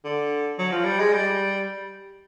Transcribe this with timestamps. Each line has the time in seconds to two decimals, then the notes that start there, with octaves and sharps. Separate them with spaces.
0.04 D3
0.59 F#3
0.72 F3
0.85 G3
0.99 G#3
1.13 G3